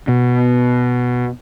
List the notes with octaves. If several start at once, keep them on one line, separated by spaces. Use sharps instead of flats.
B2